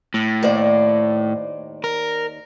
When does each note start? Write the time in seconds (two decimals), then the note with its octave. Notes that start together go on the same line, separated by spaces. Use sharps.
0.14 A2
0.43 D#2 C5 D5
1.84 A#4